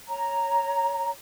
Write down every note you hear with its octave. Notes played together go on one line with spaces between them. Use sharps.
C#5 A#5